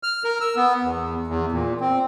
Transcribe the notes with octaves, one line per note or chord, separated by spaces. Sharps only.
F6
A#4
E6
B3
E2
E2
A#2
C4